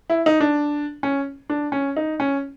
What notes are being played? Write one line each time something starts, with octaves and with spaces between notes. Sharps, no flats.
E4
D#4
D4
C#4
D4
C#4
D#4
C#4